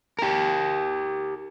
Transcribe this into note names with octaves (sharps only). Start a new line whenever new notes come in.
G4 A#4